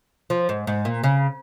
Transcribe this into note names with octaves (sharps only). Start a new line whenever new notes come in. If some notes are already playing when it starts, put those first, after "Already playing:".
F3
G#2
G#2
A#2
C#3